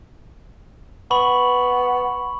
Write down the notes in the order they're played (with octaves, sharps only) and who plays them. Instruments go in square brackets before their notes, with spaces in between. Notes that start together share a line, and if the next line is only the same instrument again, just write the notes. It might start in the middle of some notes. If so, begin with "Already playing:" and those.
[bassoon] B3 [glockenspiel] B5 C#6 F#7